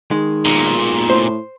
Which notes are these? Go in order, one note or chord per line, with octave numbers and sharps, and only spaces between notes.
D#3 G#3
B1 A#2
A2 C5